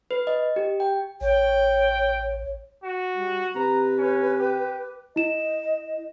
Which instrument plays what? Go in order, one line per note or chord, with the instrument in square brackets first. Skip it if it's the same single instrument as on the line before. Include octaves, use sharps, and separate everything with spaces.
[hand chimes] B4
D#5
G4
G5
[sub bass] A1 [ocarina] C#5 [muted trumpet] G5
[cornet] F#4
[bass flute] G3
[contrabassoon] C3 [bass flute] B4 [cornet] A#5
[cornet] C#4
G4
[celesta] E4 E7 [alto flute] D#5